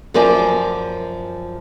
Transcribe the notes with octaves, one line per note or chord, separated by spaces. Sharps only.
F#2 F3 A#4 D5 G#5